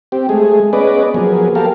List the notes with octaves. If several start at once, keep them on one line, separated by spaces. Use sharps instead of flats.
C4 G4
G#3 A3 G#4
B3 C#4 G#4 B4 D5 D#5
F3 F#3 A#3 B3 G#4
G4 A4 A#4 F5